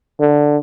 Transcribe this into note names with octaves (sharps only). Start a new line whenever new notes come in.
D3